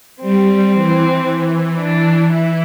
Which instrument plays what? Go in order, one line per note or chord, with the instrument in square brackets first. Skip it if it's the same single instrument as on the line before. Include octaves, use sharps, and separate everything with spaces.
[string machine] G3 [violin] C4
[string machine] E3
[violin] D4
E4